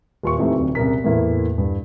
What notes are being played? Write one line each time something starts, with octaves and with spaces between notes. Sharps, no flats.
D#1 C6 C#6
F2 E3 A3 D#4 G4
D1 C3 D4
C2 C#3 A#4 B6
E2 A2 E3 A3 A#3 E4
G2